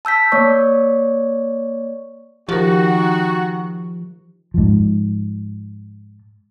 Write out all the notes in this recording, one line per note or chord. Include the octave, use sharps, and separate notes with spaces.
A5 E6 G6 B6
A#3 C#5 D5 C#6
D#3 F3 F#4 G4 A#4
G#2 F3